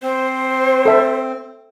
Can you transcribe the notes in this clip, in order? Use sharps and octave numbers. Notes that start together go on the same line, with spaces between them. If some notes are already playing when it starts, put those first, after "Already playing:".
C4 C5
A4 E5